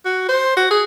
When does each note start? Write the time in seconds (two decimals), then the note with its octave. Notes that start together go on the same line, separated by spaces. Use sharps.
0.05 F#4
0.29 C5
0.57 F#4
0.71 G#4